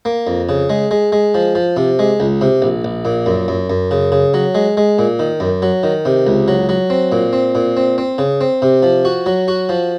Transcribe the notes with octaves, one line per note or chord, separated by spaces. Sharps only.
A#3
F2
C#3
G#3
G#3
G#3
F3
F3
C3
G#3
C#2
C3
A#1
A#1
A#2
F#2
F#2
F#2
C#3
C#3
F#3
G#3
G#3
A#2
D#3
F#2
F#3
D#3
C3
C#2
F#3
F#3
C4
A#2
C4
A#2
C4
C4
C#3
C4
C3
F3
F#4
F#3
F#4
F3